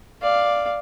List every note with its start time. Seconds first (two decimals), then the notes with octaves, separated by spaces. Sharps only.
0.22 D5 F5